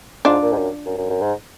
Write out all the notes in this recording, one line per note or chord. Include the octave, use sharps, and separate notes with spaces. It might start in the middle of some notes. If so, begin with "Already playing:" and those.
G#2 D4 F4
A#2
G#2
F#2
F#2
F#2
F#2
G#2